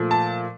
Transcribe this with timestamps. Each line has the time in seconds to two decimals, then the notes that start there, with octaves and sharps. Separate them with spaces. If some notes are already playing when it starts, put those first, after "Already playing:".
Already playing: A#2 F3 A3
0.11 A5